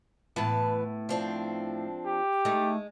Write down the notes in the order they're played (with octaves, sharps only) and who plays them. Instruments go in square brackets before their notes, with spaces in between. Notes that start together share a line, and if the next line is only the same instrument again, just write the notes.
[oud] A2 B3 [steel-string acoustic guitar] E3 B4 A5
[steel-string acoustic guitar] F3 C4 D4
[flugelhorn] G4
[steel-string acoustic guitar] G#3 [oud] A3 D#4